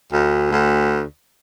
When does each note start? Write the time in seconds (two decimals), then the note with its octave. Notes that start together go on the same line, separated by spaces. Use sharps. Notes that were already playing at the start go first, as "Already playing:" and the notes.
0.12 D2
0.51 D2